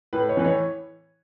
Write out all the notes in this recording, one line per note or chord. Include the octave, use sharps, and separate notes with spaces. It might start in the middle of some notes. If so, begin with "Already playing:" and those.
A2 B4
C#5
E3 B4
C#5